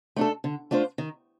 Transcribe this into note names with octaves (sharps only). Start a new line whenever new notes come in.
A3 D4 A4
D3
A3 D4 F4 C5
D#3